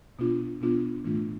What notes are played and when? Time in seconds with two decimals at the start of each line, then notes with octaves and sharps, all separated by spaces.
0.19 B2 B3 D4 F4
0.61 B2 B3 D4 F4
1.04 A2 E3 A3 D4 F4